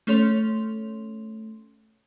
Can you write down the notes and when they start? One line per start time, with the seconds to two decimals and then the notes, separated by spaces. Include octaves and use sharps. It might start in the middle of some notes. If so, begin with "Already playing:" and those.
0.07 A3 C#4 A4 C#5 C6 F7